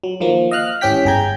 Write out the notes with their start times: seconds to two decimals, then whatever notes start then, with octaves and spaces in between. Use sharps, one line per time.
0.04 F#3
0.20 D#3 F3 A#3
0.51 D#5 F5 F6 F#6
0.81 G#1 E3 C#4 G4 G5 B6
1.05 G1 G#4 G5 A#5 G6 G#6